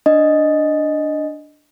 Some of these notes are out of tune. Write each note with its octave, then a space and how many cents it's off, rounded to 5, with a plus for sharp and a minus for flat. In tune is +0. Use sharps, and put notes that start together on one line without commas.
D4 +0 D#5 +0